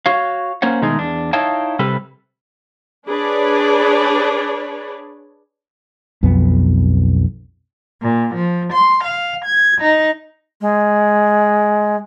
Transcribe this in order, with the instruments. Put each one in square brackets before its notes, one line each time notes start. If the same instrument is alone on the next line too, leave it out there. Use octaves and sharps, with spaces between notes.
[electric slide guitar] F#4 C#5 F5
A#3 C#4 C5 C#5 F#5
B2 D#3 G#3 A3 D#4 G#4
E2 D4
D#4 E4 C#5 F5 G5 A5
C3 G3 A4 B4
[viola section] D4 G#4 B4 C#5 D5
[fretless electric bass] B1 F2 B3
[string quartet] A#2
F3
C6
F5
G#6
D#4
[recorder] G#3